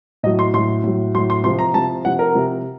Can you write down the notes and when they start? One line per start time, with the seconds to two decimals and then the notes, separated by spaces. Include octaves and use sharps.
0.23 A2 D#5
0.26 F#3
0.39 C6
0.53 A2 F#3 C6
0.84 A2 F#3
1.15 A2 F#3 C6
1.30 C6
1.44 C3 F3 C6
1.59 A#5
1.74 C3 F3 A5
2.04 C3 F3 F#5
2.19 A#4
2.35 C3 F3